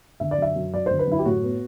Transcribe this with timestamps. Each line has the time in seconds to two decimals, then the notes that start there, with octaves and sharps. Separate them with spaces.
0.20 D3 E5
0.31 D5
0.38 F#2 E5
0.56 F#2
0.74 F#3 D5
0.86 D3 C5
0.99 B4
1.07 F#2 E4
1.19 G4
1.25 A2 F#4
1.43 B3